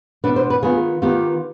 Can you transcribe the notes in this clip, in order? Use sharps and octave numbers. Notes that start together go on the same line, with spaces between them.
B2 B3 D4 B4
C5
B4
D#3 B3 F4 G#4
D#3 B3 F4 G4